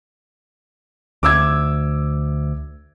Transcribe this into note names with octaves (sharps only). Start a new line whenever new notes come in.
D2 D6 E6 G#6